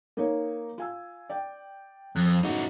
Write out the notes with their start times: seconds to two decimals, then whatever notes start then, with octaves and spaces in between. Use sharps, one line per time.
0.17 A#3 D#4 C#5
0.78 F4 G#5 E6
1.30 D5 G5
2.16 F2 F#6
2.43 F#1 A2 D#4 F#4